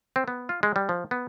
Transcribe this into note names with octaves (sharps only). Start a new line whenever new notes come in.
C4
B3
F4
G#3
G3
F3
B3